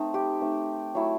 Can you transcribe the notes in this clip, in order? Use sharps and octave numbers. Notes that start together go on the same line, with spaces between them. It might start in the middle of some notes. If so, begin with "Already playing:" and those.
Already playing: A3 C4 D#4
G4
A3 C4 D#4
F#3 A3 E4